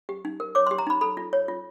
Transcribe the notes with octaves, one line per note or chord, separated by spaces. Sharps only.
G4
D#4
A#4
C#5 D6
C6
G4
A#5
D#4 B5
A4 B5
F4
C#5
F4